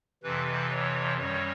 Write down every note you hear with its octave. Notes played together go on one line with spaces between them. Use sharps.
F2 C3 E3 B4
C#5
F#2 D#3 G3 C#5